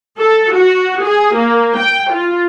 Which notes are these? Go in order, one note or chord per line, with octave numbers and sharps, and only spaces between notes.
A4
F#4
G#4
A#3
G5
F4